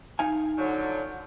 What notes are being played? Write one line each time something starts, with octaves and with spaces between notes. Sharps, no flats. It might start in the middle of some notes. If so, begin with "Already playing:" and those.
D#4 F5 G#5
D3 F3 F#3